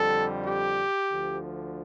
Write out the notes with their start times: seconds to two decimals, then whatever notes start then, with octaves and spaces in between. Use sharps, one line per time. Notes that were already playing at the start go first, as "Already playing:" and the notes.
Already playing: F2 D3 G3 A4
0.45 G4
1.11 D2 D3 F3